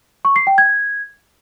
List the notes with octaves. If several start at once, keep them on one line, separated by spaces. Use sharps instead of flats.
C#6
C7
G5
G#6